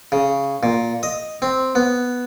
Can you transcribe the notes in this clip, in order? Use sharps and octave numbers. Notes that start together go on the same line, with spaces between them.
C#3
A#2
D#5
C4
B3